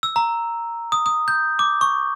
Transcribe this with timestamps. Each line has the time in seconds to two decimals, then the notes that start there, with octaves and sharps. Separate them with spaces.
0.03 E6
0.16 A#5
0.92 D#6
1.06 D#6
1.28 G6
1.59 D6
1.81 C#6